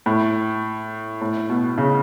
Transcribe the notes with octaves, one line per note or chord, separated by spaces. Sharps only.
A2
A2
B2
C#3